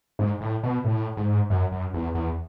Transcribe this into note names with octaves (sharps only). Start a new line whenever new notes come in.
G#2
A2
B2
A2
G#2
F#2
F#2
E2
E2